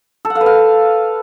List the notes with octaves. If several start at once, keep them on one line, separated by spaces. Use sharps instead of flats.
A4
F#5
F5
B4
F5